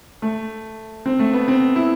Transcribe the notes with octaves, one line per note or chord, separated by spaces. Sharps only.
A3
C4
A3
B3
C4
E4